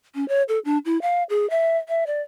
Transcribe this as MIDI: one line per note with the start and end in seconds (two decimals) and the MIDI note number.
0.15 0.27 61
0.28 0.43 73
0.48 0.59 69
0.65 0.78 62
0.85 1.00 64
1.02 1.23 77
1.30 1.48 68
1.50 1.77 76
1.89 2.04 76
2.07 2.22 74